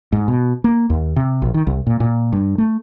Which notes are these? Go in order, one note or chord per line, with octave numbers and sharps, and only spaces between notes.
G#2
B2
A#3
D#2
C3
A#1
D#3
C2
A#2
A#2
G2
A3